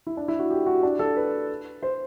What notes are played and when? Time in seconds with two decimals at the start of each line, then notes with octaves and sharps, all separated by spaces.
0.07 E4
0.17 D4
0.28 E4
0.39 F#4
0.51 G4
0.66 F#4
0.83 D4
0.99 A4
1.16 B4
1.83 C5